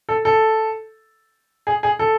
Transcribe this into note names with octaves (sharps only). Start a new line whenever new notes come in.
A4
A4
G#4
G#4
A4